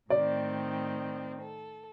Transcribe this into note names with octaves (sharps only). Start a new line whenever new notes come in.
A2 D#3 C4 D5
A4